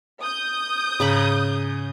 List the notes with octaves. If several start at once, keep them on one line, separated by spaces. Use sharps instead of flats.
D#6 G6
G#2 C#3 A#5 B5